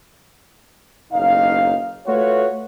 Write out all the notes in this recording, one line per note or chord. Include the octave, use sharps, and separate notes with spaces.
F#1 B1 D#4 F5
A3 F4 F#4 B4 C#5